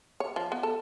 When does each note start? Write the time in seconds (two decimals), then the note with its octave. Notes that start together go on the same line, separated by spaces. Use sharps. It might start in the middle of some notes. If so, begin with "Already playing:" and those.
0.20 C#5
0.36 F3
0.52 B3
0.63 A4